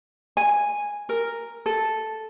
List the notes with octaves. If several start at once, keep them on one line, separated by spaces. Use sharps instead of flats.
G#5
A#4
A4